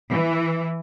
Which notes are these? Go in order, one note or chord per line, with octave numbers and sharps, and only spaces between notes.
E3